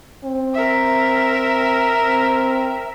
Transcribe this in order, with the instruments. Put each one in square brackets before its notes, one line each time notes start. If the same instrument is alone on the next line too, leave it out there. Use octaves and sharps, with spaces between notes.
[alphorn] C4
[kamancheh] A#4 E5
[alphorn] C4